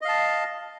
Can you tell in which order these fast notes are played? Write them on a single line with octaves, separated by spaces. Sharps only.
D#5 F5 A5